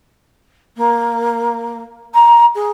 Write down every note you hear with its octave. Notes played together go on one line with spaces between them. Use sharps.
A#3
A#5
G#4